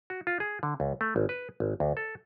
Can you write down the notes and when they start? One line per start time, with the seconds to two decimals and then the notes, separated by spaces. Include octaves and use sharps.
0.10 F#4
0.27 F4
0.40 G#4
0.63 D3
0.80 C#2
1.01 A3
1.16 G#1
1.29 B4
1.60 G#1
1.80 D2
1.97 A4